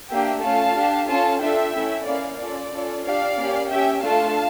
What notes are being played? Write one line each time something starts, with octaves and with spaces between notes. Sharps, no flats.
A#3 D4 G4 E5 G5
A3 C#4 F4 F5 A5
D4 G4
C#4 F4 A4 F5 A5
D4 F4 A4 E5 G5
A3 C#4 E4 A4
A#3 C#4 E4 D5 F5
C#4 F4 A4 D5
C#4 F4 A4
D4 G4 D5 F5
A#3 C#4 G4
C#4 G4 E5 G5
A3 D4 F4 A4 F5 A5